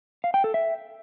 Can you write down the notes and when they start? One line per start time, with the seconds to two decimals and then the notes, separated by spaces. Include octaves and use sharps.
0.24 F5
0.34 G5
0.44 A4
0.54 E5